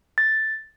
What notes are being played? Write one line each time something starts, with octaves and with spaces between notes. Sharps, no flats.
A6